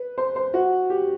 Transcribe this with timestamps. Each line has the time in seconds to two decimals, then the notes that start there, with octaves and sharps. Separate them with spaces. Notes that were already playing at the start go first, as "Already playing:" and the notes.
Already playing: B4
0.18 C5
0.36 C5
0.54 F#4
0.90 G4